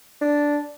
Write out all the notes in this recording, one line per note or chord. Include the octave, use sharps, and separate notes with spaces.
D4